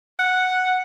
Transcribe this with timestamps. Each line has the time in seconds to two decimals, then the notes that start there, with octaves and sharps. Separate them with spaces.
0.19 F#5